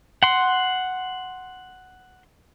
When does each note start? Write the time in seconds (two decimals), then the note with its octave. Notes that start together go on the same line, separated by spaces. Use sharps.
0.23 F#5 C6